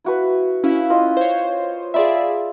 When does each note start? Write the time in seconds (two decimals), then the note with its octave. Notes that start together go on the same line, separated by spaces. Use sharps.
0.04 E4 F#4 B4
0.64 C#4 E4 F5
0.90 F4 D#5 F#5
1.17 C5 C#5
1.94 F4 G#4 D5 E5 B5